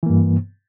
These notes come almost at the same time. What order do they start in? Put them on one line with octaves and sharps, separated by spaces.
E3 A#3 G2